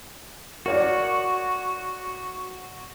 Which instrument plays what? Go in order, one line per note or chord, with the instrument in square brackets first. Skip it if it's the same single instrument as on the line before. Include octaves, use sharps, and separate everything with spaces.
[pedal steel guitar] F#4 [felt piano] A#4 C#5 D5